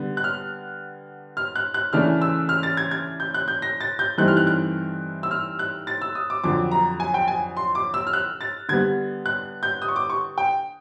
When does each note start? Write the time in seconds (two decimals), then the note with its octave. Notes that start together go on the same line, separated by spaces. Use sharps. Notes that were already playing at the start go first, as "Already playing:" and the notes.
Already playing: D3 G3 B3
0.17 F#6
0.24 F6
1.37 F6
1.55 F#6
1.74 F#6
1.93 C#3 E3 A3 D4 F6
2.22 E6
2.49 F6
2.63 A6
2.77 G#6
2.91 G#6
3.20 G6
3.34 F#6
3.48 G6
3.62 A#6
3.81 A6
3.99 G6
4.18 G2 E3 A3 C4 D#4 F#6
4.28 F6
4.37 F#6
4.47 F#6
5.23 E6
5.31 F6
5.59 F#6
5.87 A6
6.02 E6
6.15 D#6
6.30 D6
6.44 F2 D3 F#3 D6
6.71 A#5
7.00 G#5
7.14 G5
7.28 G#5
7.57 C6
7.75 D6
7.94 E6
8.07 F6
8.13 F#6
8.41 A6
8.69 D3 G3 B3 G#6
9.26 F#6
9.63 G6
9.82 D#6
9.88 C#6
9.96 D6
10.10 C#6
10.38 G5